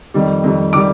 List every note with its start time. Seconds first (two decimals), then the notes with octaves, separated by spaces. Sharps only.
0.14 F2 D#3 G3
0.44 F2 D#3 G3
0.73 D#3 G3 D6